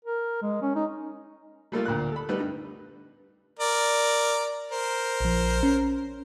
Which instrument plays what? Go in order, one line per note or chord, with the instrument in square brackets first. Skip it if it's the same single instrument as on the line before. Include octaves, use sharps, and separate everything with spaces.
[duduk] A#4
G#3
C#4
D#4
[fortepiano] G3 A3 A#3 F4
D2 A#2 A#3 F#6
A4 B5
G3 A3 B3 D#4 B4
G2
[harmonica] A#4 D5
A#4 C5
[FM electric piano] A#1 F3
C#4